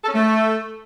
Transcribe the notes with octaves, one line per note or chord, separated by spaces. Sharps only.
A4
C#4
A3